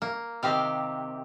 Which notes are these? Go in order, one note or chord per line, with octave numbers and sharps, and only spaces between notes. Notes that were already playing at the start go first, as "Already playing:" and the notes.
A#3
C3 D#3 C4 G4 F5